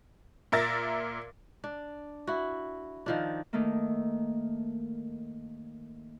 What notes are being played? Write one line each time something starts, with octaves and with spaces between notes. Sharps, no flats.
A#2 A#4 E5 A6 A#6
D4
E4 F#4
D#3 F3 D4
D#3 A3 A#3